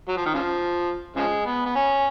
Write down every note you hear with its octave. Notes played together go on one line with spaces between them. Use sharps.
F#3
F3
D#3
C#3 F3
C#3 F3 G#3
B3
B3
C#4